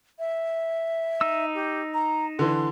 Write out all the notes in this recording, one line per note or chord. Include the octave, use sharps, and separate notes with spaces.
E5
D#4 E6
G4
A#5
D3 E3 C6